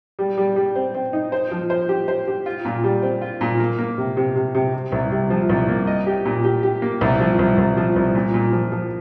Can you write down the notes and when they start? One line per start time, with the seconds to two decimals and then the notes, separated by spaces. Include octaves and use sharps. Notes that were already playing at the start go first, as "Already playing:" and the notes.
0.19 G3
0.38 G3
0.56 G3
0.75 C4
0.94 C4
1.13 D#4
1.32 C5
1.51 F3
1.70 C5
1.89 G4
2.08 C5
2.27 G4
2.46 F4
2.65 A#2
2.84 G3
3.02 C4
3.22 F4
3.41 A#2
3.60 A#3
3.79 A#3
3.98 C3
4.17 C3
4.35 C3
4.55 C3
4.74 C3
4.92 C2
5.12 C3
5.30 F3
5.49 C2
5.69 A#3
5.87 D#5
6.07 G4
6.26 A#2
6.44 G4
6.63 G4
6.82 A#3
7.01 C2
7.20 F3
7.39 C2
7.58 C2
7.77 F3
7.96 C2
8.15 A#2
8.34 A#2
8.53 F3
8.72 F3